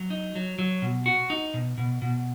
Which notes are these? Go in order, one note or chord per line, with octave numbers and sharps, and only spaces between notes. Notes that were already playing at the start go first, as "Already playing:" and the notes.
Already playing: F#3
D#4
F#3
F#3
B2
F#4
D#4
B2
B2
B2